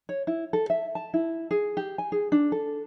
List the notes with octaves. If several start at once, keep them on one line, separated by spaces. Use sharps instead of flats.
C#5
E4
A4
E5
A5
E4
G#4
G4
G#5
G#4
D4
A4